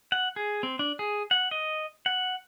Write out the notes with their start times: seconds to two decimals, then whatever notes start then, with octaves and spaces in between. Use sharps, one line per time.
0.12 F#5
0.36 G#4
0.63 C4
0.79 D4
0.99 G#4
1.31 F#5
1.51 D#5
2.06 F#5